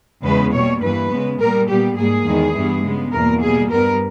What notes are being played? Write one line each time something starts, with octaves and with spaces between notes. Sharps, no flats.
E2 C#3 G#3 B3 B4
B2 G3 A#3 C#5
G2 E3 A#3 B4
C#3 G#3 B3
A#2 G3 B3 A#4
A#2 G3 B3 G4
G#2 G3 A#3 G#4
E2 D#3 G#3
G2 E3 G3 B3
C#3 G#3 B3
E2 B2 A#3 A#4
B2 G3 A#3 G#4
G2 G3 B3 A#4